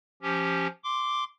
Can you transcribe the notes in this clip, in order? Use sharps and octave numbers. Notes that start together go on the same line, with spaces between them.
F3 C#4 G4
C6 D6